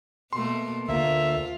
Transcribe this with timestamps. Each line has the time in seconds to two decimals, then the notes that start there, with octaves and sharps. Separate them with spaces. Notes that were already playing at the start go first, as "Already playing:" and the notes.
0.33 B2 A3 A#3 C6
0.89 D2 A#3 F4 A#4 E5